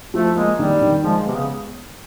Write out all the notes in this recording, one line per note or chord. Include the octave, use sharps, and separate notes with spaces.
F3 A3
G#3 A#3
D#3 G3
D#3
F3 G#3
C3 B3
C#3